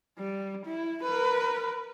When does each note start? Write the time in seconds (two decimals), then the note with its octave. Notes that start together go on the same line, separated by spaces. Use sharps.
0.19 G3
0.65 E4
1.03 A#4 B4